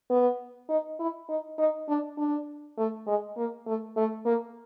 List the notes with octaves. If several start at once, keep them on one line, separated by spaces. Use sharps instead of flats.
B3
D#4
E4
D#4
D#4
D4
D4
A3
G#3
A#3
A3
A3
A#3